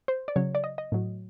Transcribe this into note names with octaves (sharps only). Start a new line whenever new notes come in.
C5
D5
C#3 F#3 C#5
D5
D#5
D#5
A2 F#3